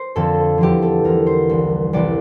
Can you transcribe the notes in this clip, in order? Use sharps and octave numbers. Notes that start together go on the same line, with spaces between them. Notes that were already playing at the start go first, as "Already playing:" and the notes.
Already playing: C5
F2 D3 F3 A4
E2 D3 F3 G4
A4
E2 D3 F3 A#4
C5
C2 C3 E3
C2 C3 E3 D5